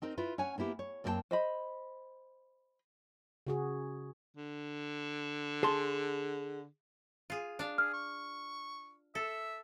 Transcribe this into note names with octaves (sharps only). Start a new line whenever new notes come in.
C4 D#4 A#4 C5
E4 F4 B4
C#4 C#5 F#5 G#5
A#3 B3 E4 G4
C#5
F#2 A#3 C4 A#4 G5 A5
C5 D#5 B5
C#3 F#4 G#4
D3
G#4 A5 C6
F4 G#4
D4 F5
G#4 F6
C#6
A4 E5